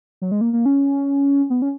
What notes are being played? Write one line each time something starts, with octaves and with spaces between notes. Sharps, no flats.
F#3
G#3
A#3
A#3
C#4
B3
C#4